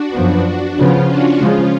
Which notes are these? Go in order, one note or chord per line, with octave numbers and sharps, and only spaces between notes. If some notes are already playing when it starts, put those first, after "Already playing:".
Already playing: D4 F#4
F#2 F3 B3
C#3 F3 B3 C#4 F4
D4 F#4
C#3 F3 G#3 C#4 F4